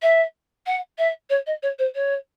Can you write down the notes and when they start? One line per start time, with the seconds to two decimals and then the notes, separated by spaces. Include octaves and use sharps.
0.02 E5
0.66 F#5
0.98 E5
1.30 C#5
1.46 D#5
1.63 C#5
1.79 C5
1.95 C#5